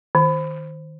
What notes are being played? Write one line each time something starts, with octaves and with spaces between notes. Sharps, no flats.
D#3